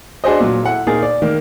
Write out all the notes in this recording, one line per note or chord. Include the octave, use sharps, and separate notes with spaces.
D4 F#4 G#4 C5 D#5
A#2 F#3
E4 A4 F#5
A#2 D#4 G#4 A#4 A6
D5
D#3 A#3